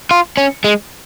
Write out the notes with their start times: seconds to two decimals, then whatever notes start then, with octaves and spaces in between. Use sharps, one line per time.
0.11 F4
0.37 C#4
0.64 G#3